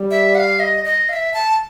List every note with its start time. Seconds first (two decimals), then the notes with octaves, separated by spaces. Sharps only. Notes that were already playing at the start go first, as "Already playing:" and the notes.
Already playing: G3
0.11 E5
0.35 F#5
0.39 F5
0.60 D#5
0.85 D#5
1.09 F5
1.13 E5
1.34 A5